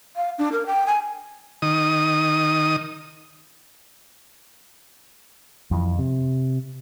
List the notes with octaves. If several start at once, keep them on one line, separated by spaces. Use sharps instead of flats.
F5
D4
A#4
G5
G#5
D#3 D#6
F2 E3
C3